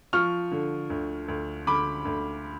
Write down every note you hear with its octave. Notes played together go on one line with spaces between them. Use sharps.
F3 C#6 F6
D3
D2
D2
D3 B5 D6
D2